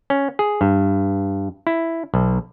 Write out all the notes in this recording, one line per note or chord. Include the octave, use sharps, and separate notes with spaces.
C#4
G#4
G2
E4
B1